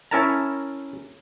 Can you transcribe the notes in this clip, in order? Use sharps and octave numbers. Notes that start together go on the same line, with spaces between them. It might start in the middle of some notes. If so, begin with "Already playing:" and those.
C#4 E4 A#4 A5 A#5